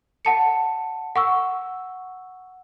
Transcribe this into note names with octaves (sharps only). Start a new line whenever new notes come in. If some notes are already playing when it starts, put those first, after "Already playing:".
F#5 A5 C#7
F#5 C#6 E6